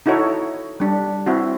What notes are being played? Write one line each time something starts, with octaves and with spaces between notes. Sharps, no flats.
D#4 E4 F#4 A4 C#5
G3 D4
C4 E4 F#4